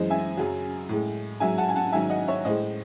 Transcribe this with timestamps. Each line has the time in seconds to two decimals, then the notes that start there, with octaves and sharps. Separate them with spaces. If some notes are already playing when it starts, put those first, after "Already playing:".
Already playing: F#2 E3 G#3 C5 D#5
0.10 E5 G#5
0.37 F#2 C#3 F#3
0.89 A2 G#3
1.40 G#2 F#3 E5 G#5
1.58 F#5 A5
1.69 G#5
1.76 F#5 A5
1.92 G#2 D#3 F#3 E5 G#5
2.10 D#5 F#5
2.28 C#5 E5
2.45 A2 G#3 C5 D#5